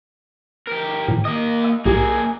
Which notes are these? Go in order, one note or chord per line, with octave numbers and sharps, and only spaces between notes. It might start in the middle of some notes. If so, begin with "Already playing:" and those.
G4 A#4
A2 D#3
A#3 D#5 D#6
F5 E6
B1 A2 A#3 G4 G#4